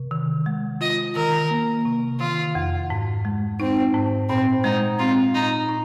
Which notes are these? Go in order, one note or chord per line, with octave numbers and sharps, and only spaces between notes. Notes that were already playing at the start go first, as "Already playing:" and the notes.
Already playing: C3
D#3
G#3
F4 D#5
D#3 A#4
A#3
C3
D#3 F4
F2
G#2
G#3
C4 D#4
G#2
A#2 C4
G#3 D#4
C4 F4
A#2 D#4
D#4